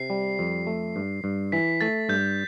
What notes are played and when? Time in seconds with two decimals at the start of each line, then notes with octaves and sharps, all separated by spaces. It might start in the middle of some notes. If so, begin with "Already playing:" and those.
Already playing: C3 C7
0.10 G3
0.39 F2
0.67 A3
0.96 G2
1.24 G2
1.52 E3 B6
1.81 A3 A6
2.09 G2 G6